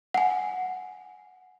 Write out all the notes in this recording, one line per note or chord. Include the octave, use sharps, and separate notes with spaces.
F#5 G#5